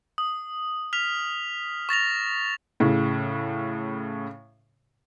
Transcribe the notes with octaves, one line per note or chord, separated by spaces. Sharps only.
D#6
F6 B6 F7
C#6 A6 A#6 F7
A2 C#3